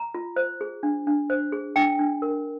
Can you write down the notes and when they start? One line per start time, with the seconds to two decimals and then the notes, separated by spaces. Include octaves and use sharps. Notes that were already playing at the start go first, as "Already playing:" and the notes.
Already playing: A#5
0.14 F4
0.36 C5
0.61 G#4
0.83 D4
1.07 D4
1.30 C5
1.52 G#4
1.76 D4 G5
1.99 D4
2.22 A#4